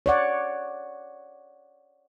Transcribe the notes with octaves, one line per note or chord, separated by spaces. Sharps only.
C#5 D5 F#5